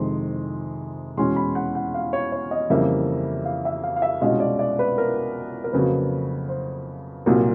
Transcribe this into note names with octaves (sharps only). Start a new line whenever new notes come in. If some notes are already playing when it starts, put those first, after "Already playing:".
Already playing: F2 C3 D#3 G#3 C6
E2 B2 G#3 C#4 C6
B5
F#5
F#5
F5
C#5
C#5
D#5
F2 C#3 E3 G3 A#3 E5
F5
E5
F5
F5
E5
C2 B2 G#3 C#4 F4 D#5
D5
D5
B4
A#4
A#4
F2 C#3 F#3 A#3 B4
C5
C2 A#2 F#3 A#3